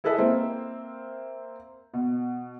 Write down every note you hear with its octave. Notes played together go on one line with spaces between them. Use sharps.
E4 G#4 A4 B4 D#5 E5
A#3 C4 C5 E5
B2